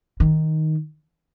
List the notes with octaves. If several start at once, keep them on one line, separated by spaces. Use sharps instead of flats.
D#3